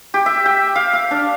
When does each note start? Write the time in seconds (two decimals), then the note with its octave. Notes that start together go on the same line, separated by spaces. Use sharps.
0.14 G4
0.26 E5
0.46 G5
0.76 F5
0.93 F5
1.11 D4